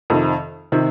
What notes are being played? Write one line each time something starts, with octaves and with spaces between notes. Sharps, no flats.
F2 C3 D#3
C3 D#3